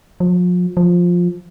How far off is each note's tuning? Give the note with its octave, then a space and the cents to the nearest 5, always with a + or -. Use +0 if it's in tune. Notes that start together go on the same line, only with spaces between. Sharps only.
F3 +40
F3 +10